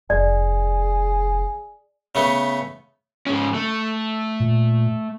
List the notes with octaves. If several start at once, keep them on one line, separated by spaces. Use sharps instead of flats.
F1 G#4 D5
C#3 A3 B3
G#2 C#3 C#4
A3
A#2